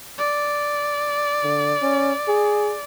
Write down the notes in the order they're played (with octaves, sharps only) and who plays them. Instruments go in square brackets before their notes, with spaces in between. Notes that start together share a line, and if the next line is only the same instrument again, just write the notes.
[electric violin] D5
[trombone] D3
C#4
G#4